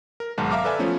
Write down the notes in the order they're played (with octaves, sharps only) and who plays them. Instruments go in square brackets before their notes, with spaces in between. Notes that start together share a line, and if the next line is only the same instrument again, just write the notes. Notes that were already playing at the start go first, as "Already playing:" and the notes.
[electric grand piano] A#4
B1 G#2 D#3 F#5 A5
E5 F5 A#5 D6 F6
A4 B4 D5 E5 G#5
F3 A3 B3 C#4